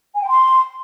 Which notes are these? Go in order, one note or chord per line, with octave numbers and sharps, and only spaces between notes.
G#5
G5
C6